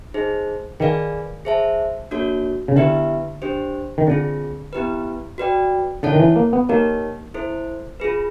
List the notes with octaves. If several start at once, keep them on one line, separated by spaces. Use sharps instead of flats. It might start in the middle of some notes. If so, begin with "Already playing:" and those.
D#4 G#4 C5
D#3 G#4 B4 D5 F5 G#5
G#4 C5 E5 A5
A#3 D4 F#4 A4 C#5
C#3
D3 B3 E4 G4 B4 E5
D4 G4 C5
D#3
D3 C4 F4 G#4
B3 E4 G4 B4
F#4 B4 D5 G5
D3 E4 A4 C#5 F#5 A5
D#3
E3
A#3
B3
A#3 D#4 G4 A#4 C#5
E4 A4 C5
F4 G#4 B4